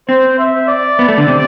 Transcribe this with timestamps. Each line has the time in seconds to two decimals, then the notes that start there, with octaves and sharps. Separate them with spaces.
0.09 C4 C5
0.39 E5
0.68 D5
0.99 B3
1.09 A3
1.18 D3
1.28 C3